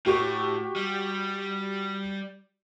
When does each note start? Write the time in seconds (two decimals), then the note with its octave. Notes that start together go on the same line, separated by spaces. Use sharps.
0.06 A2 F#4 G4 C#6
0.76 G3